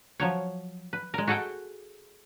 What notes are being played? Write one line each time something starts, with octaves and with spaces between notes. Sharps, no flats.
F3 F#3 C#5
B4
G#3 A#4
F#4 G#4 A4 F#5 G5